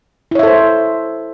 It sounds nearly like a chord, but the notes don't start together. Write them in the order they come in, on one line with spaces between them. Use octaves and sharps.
E4 C#5 E5 A4 C5